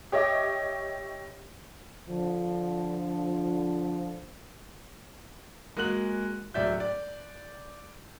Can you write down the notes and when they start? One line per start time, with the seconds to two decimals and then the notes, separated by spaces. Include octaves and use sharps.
0.12 G4 C#5 D#5 E5 D6
2.09 D3 F3
5.77 G#3 A#3 F#4 F#6 F#7
6.54 D1 F#3 D5 E5 G6
6.80 D5